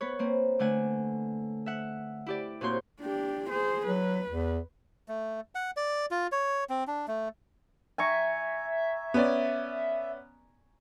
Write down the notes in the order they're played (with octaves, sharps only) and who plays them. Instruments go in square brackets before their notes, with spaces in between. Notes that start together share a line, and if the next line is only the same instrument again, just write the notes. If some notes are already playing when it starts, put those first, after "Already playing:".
[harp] B3 B4 C#5
A#3 C4
D3 A3 F#5 G#5
E5 F#5
E4 G4 D5
A#2 C4 F#4 C#5 C6 G6
[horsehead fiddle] D4 G4
G#4 C5
[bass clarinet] F#3 [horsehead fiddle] B4
[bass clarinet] E2
[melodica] A3
F#5
D5
F4
C#5
C4
D4
A3
[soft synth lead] E5 [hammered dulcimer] G#5 A#5 C#6
[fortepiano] B3 C#4 D5